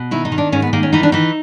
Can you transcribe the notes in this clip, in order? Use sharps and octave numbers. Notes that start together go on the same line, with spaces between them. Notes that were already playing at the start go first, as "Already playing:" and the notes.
Already playing: B2
D#3 E4
D#4
D#3
D4
G#2 C#4
B3
D#3 A#3
C#4
E3 D#4
D4
E3 D#4